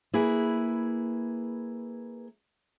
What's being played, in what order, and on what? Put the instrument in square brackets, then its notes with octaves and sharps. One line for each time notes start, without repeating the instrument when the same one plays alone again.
[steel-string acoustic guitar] A#3 E4 G#4 B4